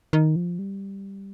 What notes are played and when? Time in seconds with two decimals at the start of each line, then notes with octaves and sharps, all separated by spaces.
0.13 D#3
0.36 F3
0.59 G3